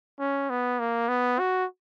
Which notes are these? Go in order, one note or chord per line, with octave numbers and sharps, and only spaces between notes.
C#4
B3
A#3
B3
F#4